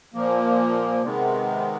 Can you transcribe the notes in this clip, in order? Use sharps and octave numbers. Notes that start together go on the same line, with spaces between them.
A#2 F3 A#3
C3 D#3 G#3 B3